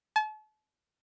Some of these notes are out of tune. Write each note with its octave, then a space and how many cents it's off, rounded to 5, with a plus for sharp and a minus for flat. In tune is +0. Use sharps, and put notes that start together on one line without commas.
A5 -40